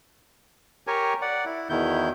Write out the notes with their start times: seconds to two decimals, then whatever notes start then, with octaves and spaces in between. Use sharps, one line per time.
0.87 G4 A#4 C#5 G#5
1.22 D5 F#5
1.45 E4
1.70 E2 B2 D#3 E4 G6